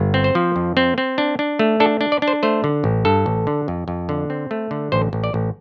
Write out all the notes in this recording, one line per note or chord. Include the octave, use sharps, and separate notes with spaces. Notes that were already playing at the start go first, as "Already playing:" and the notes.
Already playing: G1
C4
C5
F3
F2
C4
C4
D4
D4
A3
D4 A4
D4
D5
D4
C5
A3 C5
D3
A1
G2 A4
A1
D3
F2
F2
D3
C4
A3
D3
A1 C5
A1
D5
A1